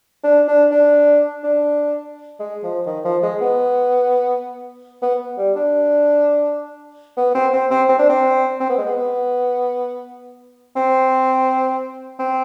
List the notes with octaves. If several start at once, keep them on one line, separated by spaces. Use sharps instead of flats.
D4
D4
D4
D4
G#3
F3
D#3
F3
G#3
B3
B3
G3
D4
B3
C4
C4
C4
C4
D4
C4
C4
B3
G#3
B3
C4
C4